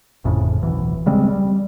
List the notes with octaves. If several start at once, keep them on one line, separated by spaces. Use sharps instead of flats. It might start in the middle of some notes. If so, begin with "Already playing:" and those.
G1 F2 A2 C#3
D1 B1 E3
C#3 G3 G#3 C4
G3